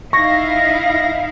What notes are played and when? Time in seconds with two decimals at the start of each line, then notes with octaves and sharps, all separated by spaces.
0.13 D#4 E4 F5 C#6 A#6